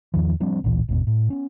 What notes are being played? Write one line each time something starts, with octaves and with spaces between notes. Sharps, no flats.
E2 D#3 F3
F3 G3 C4 D4
A1 D2 A#2 E3
G#1 E2 B2
A2
B3 C#4